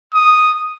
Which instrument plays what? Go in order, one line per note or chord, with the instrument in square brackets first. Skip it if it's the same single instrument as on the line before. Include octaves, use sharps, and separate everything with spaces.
[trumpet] D#6